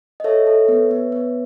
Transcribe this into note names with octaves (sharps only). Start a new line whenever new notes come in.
D#5
A4 C#5 E5
A4
B3
B3
B3